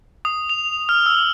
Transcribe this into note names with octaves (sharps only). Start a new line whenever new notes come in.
D#6
F7
F6
E6